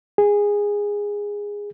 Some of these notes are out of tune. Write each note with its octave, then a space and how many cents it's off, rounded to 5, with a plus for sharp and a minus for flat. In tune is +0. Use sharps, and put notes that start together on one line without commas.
G#4 -15